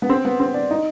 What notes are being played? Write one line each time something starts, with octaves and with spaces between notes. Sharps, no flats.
B3
C4
B3
C4
D4
D#4